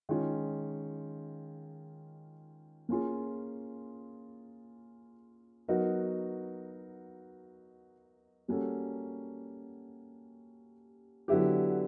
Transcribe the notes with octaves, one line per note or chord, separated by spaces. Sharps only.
D#3 G#3 C#4 F4
A#3 C#4 F4 G#4
F#3 B3 D#4 F#4 A#4
G3 A#3 C#4 F#4 A4
D3 F#3 B3 E4 G4